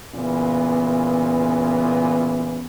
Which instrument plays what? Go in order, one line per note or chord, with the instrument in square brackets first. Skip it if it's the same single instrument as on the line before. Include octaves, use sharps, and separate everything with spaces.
[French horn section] A#2 C#3 E3 B3 C#4